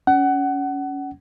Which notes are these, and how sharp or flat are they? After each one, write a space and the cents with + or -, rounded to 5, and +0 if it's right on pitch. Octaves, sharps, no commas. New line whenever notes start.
C#4 +20 F#5 +25